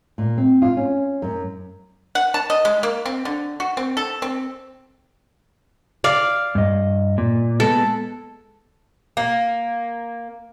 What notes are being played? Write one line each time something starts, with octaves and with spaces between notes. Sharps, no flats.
A#2
C4
F4
C#4
F#2
F#5
A5
D#5
G#3
A#3
C4
D3
F#4
C4
A4
C4
D5 F5
G2 D#5
A#2
G#3 B3 A4
A#3